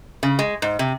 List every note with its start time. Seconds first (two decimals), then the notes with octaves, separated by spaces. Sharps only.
0.23 C#3
0.39 G#3
0.62 G#2
0.79 C3